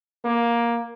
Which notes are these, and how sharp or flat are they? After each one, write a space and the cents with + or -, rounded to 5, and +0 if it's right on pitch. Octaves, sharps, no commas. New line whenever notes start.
A#3 +10